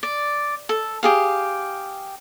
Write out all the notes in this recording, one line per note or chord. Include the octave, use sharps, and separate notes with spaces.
D5
A4
G4 G#4 F5